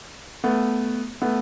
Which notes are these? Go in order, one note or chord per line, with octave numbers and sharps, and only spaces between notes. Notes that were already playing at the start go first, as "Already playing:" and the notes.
A3 B3
A3 B3